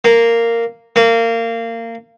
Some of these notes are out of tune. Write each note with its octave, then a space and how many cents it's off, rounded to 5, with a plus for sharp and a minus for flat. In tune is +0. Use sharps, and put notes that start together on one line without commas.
A#3 -10
A#3 -25